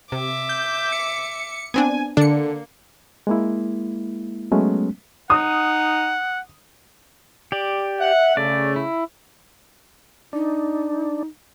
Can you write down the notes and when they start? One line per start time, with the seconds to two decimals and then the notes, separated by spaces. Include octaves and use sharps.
0.12 C3 E5 D6
0.49 G6
0.92 C#7
1.74 B3 C4 D4 G#5
2.17 D3 A#3 D4 C#7
3.27 G#3 A#3 E4
4.52 F#3 G#3 A3 B3 C#4
5.30 D#4 F#5 D#6
7.52 G4 D5
8.01 E5 F#5
8.37 C#3 A3 D5
8.76 E4
10.33 D4 D#4